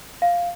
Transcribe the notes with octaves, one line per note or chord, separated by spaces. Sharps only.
F5